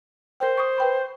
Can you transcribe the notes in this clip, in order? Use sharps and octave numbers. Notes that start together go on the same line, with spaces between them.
A#4 C5 G5
C#6 D#6
B4 G5 B5